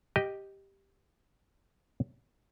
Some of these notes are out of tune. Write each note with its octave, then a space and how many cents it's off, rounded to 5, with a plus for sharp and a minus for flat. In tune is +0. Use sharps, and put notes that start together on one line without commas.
G4 +0 D#5 +0